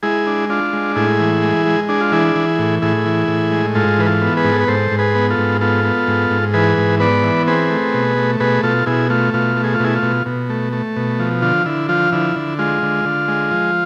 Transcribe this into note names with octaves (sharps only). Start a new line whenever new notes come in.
G#3 E4 G#4
D4
D4 F4
G#3
A2 E4 G#4
E3
G#3
G#3
D4 G#4
F4
E3 E4 G#4
E3
A2
A2 E4 G#4
E3
A2
G#3
G#2 F4 A4
E3 B4
F4 A4
B3
G#4 B4
G#2
A4
B4
G#2 A4 C5
G#2
G#4 B4
B3
F4 A4
G#2
B3 F4 A4
B3
G#2
G#2
E3 G#4 B4
G#2
B3 B4 D5
E3
C4 G#4 B4
A3
B2
A3
B2 G#4 B4
B2 F4 A4
B2 E4 G#4
A3 F4
B2 F4
A3
G#4
F4
B2 E4 G#4
F4
B2
B2
A3
A3
B2
F3
D3 F4
D3 E4
F3 F4
D3 E4
D3
G#3 F4
D3
D3
G#3
F3